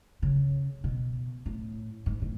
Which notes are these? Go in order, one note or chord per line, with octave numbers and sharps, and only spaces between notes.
C#3
B2
A2
G#2
A2